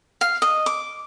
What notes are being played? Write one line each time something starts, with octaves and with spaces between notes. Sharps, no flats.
F5
D#5
D6